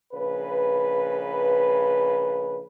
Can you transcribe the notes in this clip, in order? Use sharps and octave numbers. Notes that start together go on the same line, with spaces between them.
A#1 C#3 B4